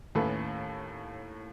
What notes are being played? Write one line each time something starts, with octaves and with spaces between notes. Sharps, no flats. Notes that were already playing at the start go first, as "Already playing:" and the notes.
D#2 A2 C#4 E4 A4 B4